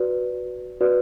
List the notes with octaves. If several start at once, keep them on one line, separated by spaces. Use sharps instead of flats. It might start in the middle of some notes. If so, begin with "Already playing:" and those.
Already playing: F#4 B4 D5
F#4 B4 D5